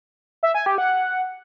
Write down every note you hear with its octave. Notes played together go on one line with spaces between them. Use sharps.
E5
G#5
G4
F#5